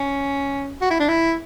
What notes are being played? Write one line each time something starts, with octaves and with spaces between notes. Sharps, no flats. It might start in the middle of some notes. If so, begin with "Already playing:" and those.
Already playing: C#4
F#4
E4
D4
E4